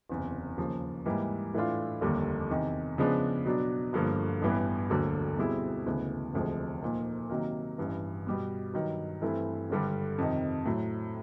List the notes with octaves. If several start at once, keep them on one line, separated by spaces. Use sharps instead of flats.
F#1 E2 C3
D#2 C#3 F3 A#3
G#2 E3 G3 A#3
A2 E3 A3 D4 F4
F1 D#2 D3 G3 A#3
E2 C3 D#3
C#3 F3 G#3 B3 D4
B2 F#3 B3 D4
G1 G2 D3 F3 A#3
A1 G2 E3 G3 B3
E1 D2 D3 F#3 A#3
B2 G3 C4 E4 G#4
D2 C#3 E3 G#3 B3
E1 D2 C3 F3 G#3
A#2 F3 A#3 D#4
C3 D#3 F#3 A#3
A1 G2 E3
B2 G3 B3
G2 D#3 F#3
G2 E3 A3 C4 E4
G#1 G2 D3 G3
F2 C3 D#3
A2 F#3 A3